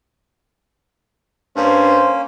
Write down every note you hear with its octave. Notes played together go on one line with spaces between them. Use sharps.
G2 A#3 C#4 C5